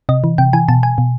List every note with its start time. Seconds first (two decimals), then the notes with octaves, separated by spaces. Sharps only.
0.09 C3 D#5
0.24 E3
0.38 C3 G5
0.53 E3 G#5
0.69 B2 A5
0.83 G#5
0.98 B2